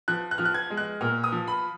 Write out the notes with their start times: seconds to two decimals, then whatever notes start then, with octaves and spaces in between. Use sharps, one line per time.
0.08 F3 F#6
0.31 F#6
0.38 F3 F6
0.45 F#6
0.54 G#6
0.70 G#3
0.77 F#6
1.01 A#2 F6
1.24 D#6
1.32 F3
1.48 B5